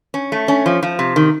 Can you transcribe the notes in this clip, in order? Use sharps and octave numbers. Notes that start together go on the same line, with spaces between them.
C#4
A3
C#4
F3
F3
C3
D#3